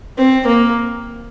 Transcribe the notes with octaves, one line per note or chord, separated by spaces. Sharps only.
C4
A#3